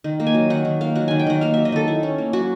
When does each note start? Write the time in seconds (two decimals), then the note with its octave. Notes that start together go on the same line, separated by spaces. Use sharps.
0.04 D#3
0.20 A#3
0.27 G#5
0.34 F#3
0.50 D#3 F#5
0.65 D#3
0.81 A#3 F5
0.95 F#3 F#5
1.08 D#3 G#5
1.19 G5
1.27 D#3 F#5
1.41 A#3 F5
1.54 F#3 E5
1.65 D#5
1.72 D#3 A4
1.88 E4
2.03 C#4
2.18 A#3
2.33 F#3 F#4